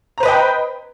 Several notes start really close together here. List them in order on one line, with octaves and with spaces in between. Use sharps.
A#5 C5 B4 D#5 G5